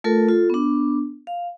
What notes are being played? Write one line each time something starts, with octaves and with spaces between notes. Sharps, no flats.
A3 F4 A4 A#4
F4 A4
B3 D4
F5